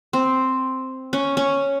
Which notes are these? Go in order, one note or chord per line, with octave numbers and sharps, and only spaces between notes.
C4
C#4
C#4